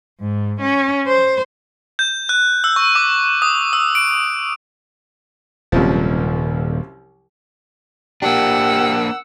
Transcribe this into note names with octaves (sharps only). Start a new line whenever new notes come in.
G#2
C#4
C5
G6
F#6
E6
C#6
D6
D#6
E6
D7
D#1 C2 F#2 F3
A#3 D4 G4 F#5 E6